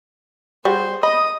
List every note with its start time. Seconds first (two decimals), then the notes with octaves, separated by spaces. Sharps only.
0.65 G3 F#4 G#4 C5
1.03 D#5 B5 D#6